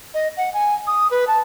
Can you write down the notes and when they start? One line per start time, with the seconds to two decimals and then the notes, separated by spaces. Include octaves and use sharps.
0.14 D#5
0.37 F#5
0.54 G#5
0.87 D#6
1.11 B4
1.27 A5